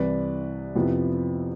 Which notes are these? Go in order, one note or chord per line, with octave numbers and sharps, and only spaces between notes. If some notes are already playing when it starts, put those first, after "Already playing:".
Already playing: C2 C3 E3 B4 D5
F2 C3 F3 B3 E4